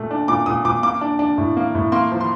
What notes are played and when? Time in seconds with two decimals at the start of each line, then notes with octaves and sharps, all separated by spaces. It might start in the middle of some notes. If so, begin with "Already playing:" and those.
Already playing: A#2 A3
0.11 D4
0.28 A#2 D6
0.46 A#2 D#6
0.65 A#2 D6
0.83 A#3 D6
1.01 D4
1.19 D4
1.38 A2
1.57 A#3
1.75 A2
1.92 A#3 C6
2.11 F3
2.21 C6